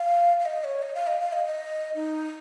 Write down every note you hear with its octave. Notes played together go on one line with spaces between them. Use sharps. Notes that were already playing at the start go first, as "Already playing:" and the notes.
Already playing: F5
F5
D#5
C#5
D#5
F5
D#5
F5
D#5
D#5
D#4